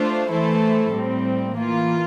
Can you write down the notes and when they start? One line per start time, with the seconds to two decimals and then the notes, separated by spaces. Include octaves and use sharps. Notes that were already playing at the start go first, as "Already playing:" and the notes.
Already playing: A3 D4 F4 C5
0.29 E3 A3 E4 A4 C5
0.92 A2 G3 C4
1.55 E3 A#3 F4